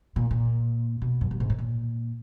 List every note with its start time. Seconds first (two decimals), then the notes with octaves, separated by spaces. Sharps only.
0.16 A#2
0.31 A#2
1.02 B2
1.21 F#2
1.31 G2
1.40 G#2
1.50 A2
1.58 A#2